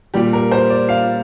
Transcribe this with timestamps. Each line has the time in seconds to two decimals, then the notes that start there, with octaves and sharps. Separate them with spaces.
0.14 A#2 G3 G4
0.33 A#4
0.52 C5
0.70 D5
0.89 F5